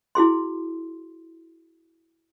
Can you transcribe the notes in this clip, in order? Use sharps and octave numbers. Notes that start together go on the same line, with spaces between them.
E4 F#4 G#4 C6